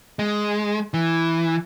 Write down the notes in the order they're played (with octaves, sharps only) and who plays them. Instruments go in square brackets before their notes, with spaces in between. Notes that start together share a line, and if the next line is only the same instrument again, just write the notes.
[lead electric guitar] G#3
E3